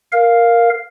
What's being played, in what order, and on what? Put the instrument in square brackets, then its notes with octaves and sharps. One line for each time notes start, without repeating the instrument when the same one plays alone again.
[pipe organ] A#4 F5